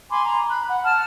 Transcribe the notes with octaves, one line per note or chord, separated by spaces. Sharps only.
G#5 B5 C6 D6
A#5
B5 F#6
F#5
F#5 A5 F6